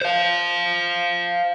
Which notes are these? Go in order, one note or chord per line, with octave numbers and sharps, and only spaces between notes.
C5 F5